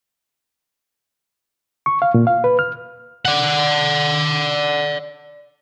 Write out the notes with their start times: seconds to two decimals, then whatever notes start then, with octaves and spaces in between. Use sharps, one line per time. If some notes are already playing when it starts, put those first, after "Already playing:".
1.86 C#6
2.02 F5
2.14 A#2
2.27 F5
2.44 B4
2.59 F6
3.25 D5 F#5